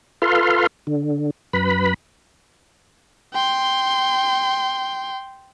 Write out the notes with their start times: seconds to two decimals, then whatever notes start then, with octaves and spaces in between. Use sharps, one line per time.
0.22 F4 A4 B4 F5 C6
0.87 D3
1.53 F#2 B4 B5
3.33 G5 C6